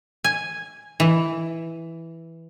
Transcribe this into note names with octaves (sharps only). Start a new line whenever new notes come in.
G#5
E3